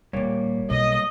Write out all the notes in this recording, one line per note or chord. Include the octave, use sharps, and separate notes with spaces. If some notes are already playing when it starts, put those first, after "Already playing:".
D#1 A#2 G3 A#3 C#5
B1 B2 D#5